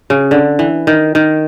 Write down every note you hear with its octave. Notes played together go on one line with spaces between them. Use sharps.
C#3
D3
E3
D#3
D#3